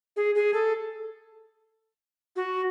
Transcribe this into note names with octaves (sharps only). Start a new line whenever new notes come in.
G#4
G#4
A4
F#4